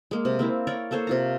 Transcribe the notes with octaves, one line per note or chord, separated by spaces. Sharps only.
G#3 A#3
C3
A#3 C4 E4
A#4 C#5 D5
A#3 A4 C5 C#5
C3 F4 A#5